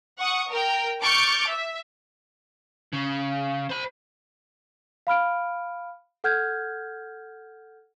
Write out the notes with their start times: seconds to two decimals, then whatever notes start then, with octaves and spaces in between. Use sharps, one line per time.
0.19 F#5 C#6 D#6
0.50 A#4 G5
1.01 C#6 D6 F6 G6 A6 D7
1.49 E5
2.93 C#3
3.69 C5 B5
5.07 F5 B5 F6 D7
6.24 A4 F#5 F6 G6 G#6